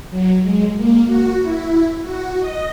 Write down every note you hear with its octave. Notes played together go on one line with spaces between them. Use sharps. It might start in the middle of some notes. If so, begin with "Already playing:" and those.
F#3
G#3
A#3
F#4
E4
F#4
D#5